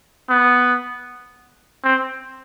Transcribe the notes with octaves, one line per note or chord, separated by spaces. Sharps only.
B3
C4